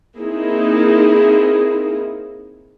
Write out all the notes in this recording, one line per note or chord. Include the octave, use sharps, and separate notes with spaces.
A#3 C4 D#4 E4 G#4